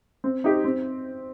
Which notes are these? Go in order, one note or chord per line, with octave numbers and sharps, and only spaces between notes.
C4
D#4 G4 C5
C4